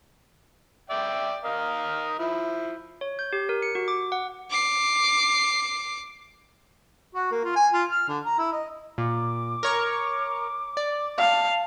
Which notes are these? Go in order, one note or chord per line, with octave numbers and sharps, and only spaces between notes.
D5 E5 G5
A#4 D#5 F5
F3 E4
C#5
G6
G4
A#4
C#7
F#4
D6
F#5
D6 C7
F#4
A#3
F4
G#5
F4
F6
D3
A#5
E4
D#5
A#2 D6
A#4 C#5 C#6
D5
F5 A5